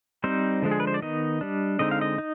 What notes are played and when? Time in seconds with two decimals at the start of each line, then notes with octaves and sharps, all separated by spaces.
0.24 G3 C4 D#4 C5
0.62 D3 F3 G#3 D4
0.72 G#4
0.80 B4
0.87 C5
0.94 D5
1.02 D#3 B3 D#4 D#5
1.41 G3 D4
1.79 D3 G#3 C4 D#4 D#5
1.91 F5
2.01 D#5
2.18 D#4